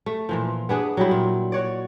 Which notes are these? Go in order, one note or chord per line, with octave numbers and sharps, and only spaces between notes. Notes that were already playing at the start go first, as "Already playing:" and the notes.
A3
A#2 E3 F3
B3 D4 G#4 B4
F#3 G3 E4
A#2
F#4 C#5 D5